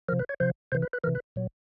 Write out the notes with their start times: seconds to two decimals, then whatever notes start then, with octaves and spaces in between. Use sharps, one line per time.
0.09 C3 F3 A#4
0.19 B4
0.29 C#5
0.40 C3 F3 C5
0.72 C3 E3 C5
0.82 B4
0.93 B4
1.04 E3 A#4
1.07 C3
1.15 B4
1.36 A#2 F#3